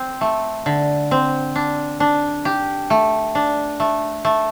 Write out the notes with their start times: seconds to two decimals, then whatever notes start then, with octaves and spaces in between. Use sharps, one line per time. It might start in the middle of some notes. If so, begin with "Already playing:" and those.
Already playing: C4
0.21 A3
0.66 D3
1.11 C4
1.55 D4
2.00 D4
2.45 G4
2.90 A3
3.35 D4
3.80 A3
4.25 A3